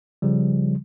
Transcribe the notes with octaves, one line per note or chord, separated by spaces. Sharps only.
C#3 F3 G3